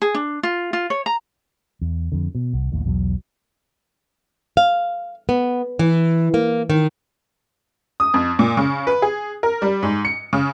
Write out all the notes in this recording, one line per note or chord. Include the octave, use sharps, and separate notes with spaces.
G#4
D4
F4
F4
C#5
A#5
E2
F2 D3
B2
C2
A1 D#2 A2
B1 E2 E3 F#3
F5
B3
E3
A#3
D#3
D#6
F2
A#2
C#3
B4
G#4
A#4
G3
G#2
C#7
C#3